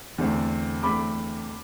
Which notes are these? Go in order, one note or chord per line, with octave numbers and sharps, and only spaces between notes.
E2 D3 A3 C4
E2 D3 A3 C4 B5 D6